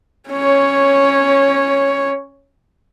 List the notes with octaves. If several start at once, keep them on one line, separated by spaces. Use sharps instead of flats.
C#4 C#5